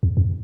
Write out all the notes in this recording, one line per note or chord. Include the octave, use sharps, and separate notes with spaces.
E2
F2